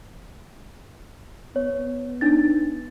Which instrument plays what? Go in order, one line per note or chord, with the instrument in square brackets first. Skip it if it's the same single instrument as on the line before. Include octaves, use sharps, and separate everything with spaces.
[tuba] B3 [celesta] C#5
[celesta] D4 D#4 A6